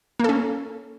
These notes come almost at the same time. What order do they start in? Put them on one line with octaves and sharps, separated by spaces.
A#3 A4 C#4